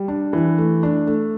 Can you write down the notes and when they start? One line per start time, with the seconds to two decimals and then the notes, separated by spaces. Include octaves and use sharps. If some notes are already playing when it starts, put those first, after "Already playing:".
Already playing: G3
0.08 D4
0.33 E3
0.58 A3
0.83 D4
1.07 A3